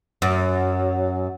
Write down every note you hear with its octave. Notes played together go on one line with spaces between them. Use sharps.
F#2